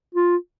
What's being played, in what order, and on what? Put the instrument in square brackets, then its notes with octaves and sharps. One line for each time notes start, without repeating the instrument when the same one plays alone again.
[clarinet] F4